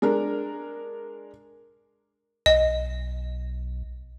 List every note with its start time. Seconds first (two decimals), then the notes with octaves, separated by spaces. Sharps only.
0.02 G#3 D4 A#4
2.46 B1 D#5